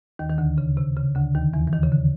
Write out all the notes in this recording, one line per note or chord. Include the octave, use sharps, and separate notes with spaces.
D#2 D#3
D#3
D2 D3
C#3
C3
C#3
D2 D3
D#2 D#3
E2 E3
E3
D#2 D#3
C#3
D3